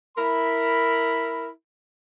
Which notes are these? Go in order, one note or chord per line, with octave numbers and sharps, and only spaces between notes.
E4 A#4 B5